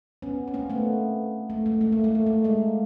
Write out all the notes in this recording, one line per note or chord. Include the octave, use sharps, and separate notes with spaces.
B3 C#4
C#4
A#3 C4
A3 B3
A3
A3
A3
A#3
A3
A#3
A3
G#3 A#3